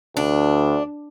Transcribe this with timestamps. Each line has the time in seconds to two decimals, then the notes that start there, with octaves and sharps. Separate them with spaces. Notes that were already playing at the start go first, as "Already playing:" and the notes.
0.17 D2 D4